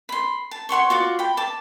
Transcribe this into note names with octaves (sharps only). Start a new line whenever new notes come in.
B5 C6
A5
C#5 F#5 C6 C#6
F4 F#4 D5
G5 B5
A5 D6